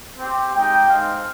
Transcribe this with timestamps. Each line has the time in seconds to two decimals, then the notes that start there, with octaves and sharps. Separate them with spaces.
0.17 C4 G4
0.52 G#3 D#4 G4 G5
0.88 G#3 C4 D#4 F5